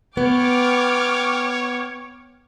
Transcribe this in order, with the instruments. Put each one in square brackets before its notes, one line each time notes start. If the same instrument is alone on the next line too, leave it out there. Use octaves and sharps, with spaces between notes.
[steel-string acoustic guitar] B3 [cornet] C#5 [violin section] G5 D6 F6